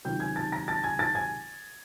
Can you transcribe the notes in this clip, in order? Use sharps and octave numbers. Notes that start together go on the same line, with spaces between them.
C#2 C3 D#3 F#3 G5 G6
G#5 G#6
A5 A6
A#5 A#6
A5 A6
G#5 G#6
A5 A6
G#5 G#6